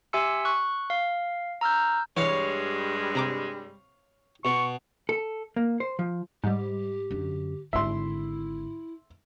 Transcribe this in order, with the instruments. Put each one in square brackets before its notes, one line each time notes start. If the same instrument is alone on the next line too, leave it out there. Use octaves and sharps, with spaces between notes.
[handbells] G4 E5 G#5 C6 E6 C#7
C#6 F#6
F5
A#5 E6 F6 G6
[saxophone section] G2 G3 G#3 [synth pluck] E3 [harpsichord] C#5 F5
[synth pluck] C3 A#5 D6
[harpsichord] B2 [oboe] C#6
[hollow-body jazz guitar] A4
A#3
C5
F3
[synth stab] G#2 G3 [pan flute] G4
[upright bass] F#2 D3
[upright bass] G#1 D3 [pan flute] E4 [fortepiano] E5 C6